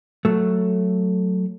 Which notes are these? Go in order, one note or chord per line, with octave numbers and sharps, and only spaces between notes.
F#3 A3